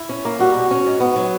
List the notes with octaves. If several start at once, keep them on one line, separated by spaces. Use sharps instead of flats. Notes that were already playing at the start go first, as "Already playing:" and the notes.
Already playing: E4
C#4
A#3
G3 F#4
B2
C#4
G#2
B3
F#3